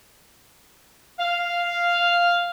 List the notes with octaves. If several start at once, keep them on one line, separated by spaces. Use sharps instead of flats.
F5